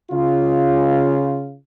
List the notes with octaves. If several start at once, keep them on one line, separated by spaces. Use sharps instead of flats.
C#3 F4